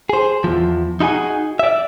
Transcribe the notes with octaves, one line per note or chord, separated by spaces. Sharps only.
G#4 C5
E2 F3
D#4 E4 F#4 G#4 G#5
D5 E5